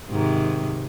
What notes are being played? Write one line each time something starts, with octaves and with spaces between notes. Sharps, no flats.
G#2 C3 D#3